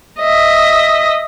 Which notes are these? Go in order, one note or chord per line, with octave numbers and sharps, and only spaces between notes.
D#5 E5